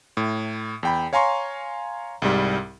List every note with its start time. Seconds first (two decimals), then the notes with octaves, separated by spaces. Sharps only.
0.17 A2
0.83 E2 G5 B5
1.13 C#5 F5 G#5 A#5 C6 C#6
2.22 C2 G#2 G3